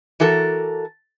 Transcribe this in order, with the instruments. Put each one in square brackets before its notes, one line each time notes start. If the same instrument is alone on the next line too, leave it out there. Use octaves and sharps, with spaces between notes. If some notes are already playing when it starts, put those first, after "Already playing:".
[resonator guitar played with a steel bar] E3 F#4 A4 A#4